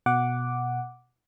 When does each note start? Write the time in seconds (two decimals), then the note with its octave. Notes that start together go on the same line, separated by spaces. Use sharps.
0.06 B2 F#5 D6